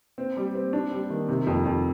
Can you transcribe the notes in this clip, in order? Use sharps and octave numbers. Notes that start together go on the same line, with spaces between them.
C4
G3
C4
D4
G3
D#3
C3
F2
F2